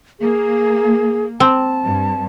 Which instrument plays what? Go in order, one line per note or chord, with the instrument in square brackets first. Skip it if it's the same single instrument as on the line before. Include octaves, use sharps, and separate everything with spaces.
[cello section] A#3 [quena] G#4
[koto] C4 [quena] A5
[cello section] G2